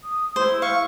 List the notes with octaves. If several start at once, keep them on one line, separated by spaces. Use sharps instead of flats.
D#6
E4 C5
F5 C#6